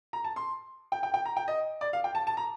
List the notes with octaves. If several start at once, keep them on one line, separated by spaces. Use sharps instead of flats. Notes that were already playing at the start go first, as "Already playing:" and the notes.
A#5
A5
C6
G5
G5
G5
A#5
G5
D#5
D5
F5
G5
A5
A5
A#5